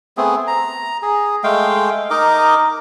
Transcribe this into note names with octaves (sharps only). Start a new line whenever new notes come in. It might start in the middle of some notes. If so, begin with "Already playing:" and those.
A3 B3 C4 G#4
A#5
G#4
G#3 A3 F5 G5
D#4 A#4 D#5 D6